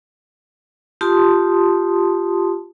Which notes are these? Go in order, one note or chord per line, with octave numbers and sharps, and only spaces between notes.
F4 G4 A5 C6 D#6